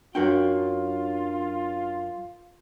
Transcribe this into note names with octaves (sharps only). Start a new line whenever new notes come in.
F#2 D4 F4 F#4 A#4 C#5 G5